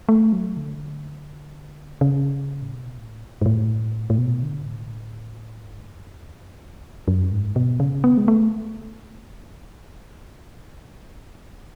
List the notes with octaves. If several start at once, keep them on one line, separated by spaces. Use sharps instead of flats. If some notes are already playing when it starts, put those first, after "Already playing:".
A3
F#3
D3
C#3
A2
B2
A2
G#2
A2
A2
B2
D3
A2
G#2
F#2
E2
F#2
E2
F#2
F#2
G#2
B2
C#3
B3
G#3
A3